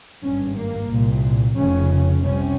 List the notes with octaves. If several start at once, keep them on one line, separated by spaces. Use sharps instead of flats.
G#1 G2 C#4
A#3
C2 A#2
F1 F2 C#3 C#4
C2 C3 C#4